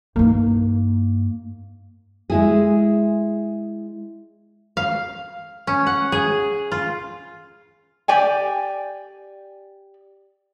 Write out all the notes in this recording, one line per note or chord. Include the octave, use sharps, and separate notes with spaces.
G2 A#3 D#4
G#3 E4 G#4
F5
C#4
F#5
G#4
F4
G4 D5 G5 G#5